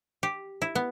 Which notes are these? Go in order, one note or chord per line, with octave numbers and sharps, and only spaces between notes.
G4
E4
B3